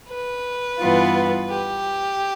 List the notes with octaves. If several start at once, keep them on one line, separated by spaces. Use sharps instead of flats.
B4
G2 E3 B3 F4
G4